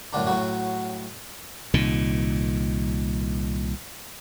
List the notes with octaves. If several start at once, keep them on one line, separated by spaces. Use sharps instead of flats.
F#2 A2 D3 D4
A2 F#3 F#4
C2 A#2 D#3